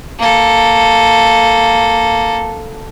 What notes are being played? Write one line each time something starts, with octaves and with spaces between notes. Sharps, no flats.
A#3 A4